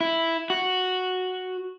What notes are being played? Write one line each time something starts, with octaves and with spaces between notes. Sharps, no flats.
E4
F#4